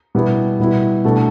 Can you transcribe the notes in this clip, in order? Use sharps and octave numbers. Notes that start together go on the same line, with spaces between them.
B2 G3 B3 E4
B2 G3 B3 E4
B2 A3 D4 A4